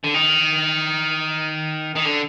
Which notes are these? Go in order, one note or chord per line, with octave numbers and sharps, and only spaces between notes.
D3
D#3
D#3
D3